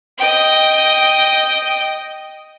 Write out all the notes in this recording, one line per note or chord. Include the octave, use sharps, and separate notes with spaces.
D#5 G5